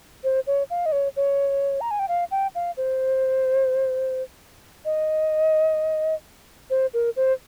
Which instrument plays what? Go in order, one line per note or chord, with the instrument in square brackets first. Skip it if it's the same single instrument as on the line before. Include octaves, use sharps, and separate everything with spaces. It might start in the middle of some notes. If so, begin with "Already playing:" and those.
[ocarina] C5
C#5
F5
D#5
C#5
C#5
A#5
G#5
G5
F5
G5
F5
C5
D#5
C5
A#4
C5